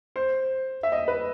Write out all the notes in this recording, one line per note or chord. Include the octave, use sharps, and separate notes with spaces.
C5
E5
D#5
B4